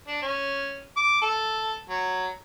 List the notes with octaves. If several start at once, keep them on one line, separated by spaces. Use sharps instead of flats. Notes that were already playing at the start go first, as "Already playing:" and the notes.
D4
C#4
D6
A4
F#3